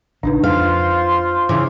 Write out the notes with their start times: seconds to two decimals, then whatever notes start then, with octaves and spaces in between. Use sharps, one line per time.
0.23 A1 C#3 D4 D#4 B4
0.44 F2 F4 C5 F5 C6
1.49 C#3 E3 D6